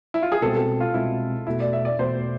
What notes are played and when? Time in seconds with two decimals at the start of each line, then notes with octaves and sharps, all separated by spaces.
0.14 E4
0.22 F4
0.32 G#4
0.41 C2 B2 G#3 C4 A4
0.55 A4
0.80 F4
0.94 C2 B2 G#3 C4 E4
1.47 E2 B2 A3 E4
1.60 D5
1.73 E5
1.85 D5
1.99 E2 B2 A3 C5